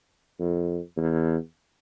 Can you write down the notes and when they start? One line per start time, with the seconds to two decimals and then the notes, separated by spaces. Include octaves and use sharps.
0.40 F2
0.97 E2